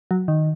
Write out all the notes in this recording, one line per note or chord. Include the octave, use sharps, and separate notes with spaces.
F#3
D#3